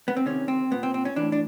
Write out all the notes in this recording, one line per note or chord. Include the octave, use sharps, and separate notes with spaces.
B3
C4
C3 D#3 C#4
C4
A#2 B3
C4
C4
C#4
A2 E3 D4
D4